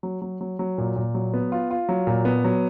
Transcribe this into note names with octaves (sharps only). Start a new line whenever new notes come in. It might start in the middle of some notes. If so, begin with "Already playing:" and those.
F#3
F#3
F#3
F#3
A#2
A#2
F#3
B3
F4
F4
F#3
A#2
B3
F#3